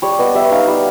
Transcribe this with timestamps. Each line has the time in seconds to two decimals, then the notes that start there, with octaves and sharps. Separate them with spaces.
0.02 G3 C#5
0.19 B3 D#5
0.35 G3 E5
0.51 D#4 F5
0.68 G3